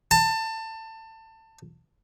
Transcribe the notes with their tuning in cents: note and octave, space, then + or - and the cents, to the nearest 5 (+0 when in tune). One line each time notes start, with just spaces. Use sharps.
A5 +25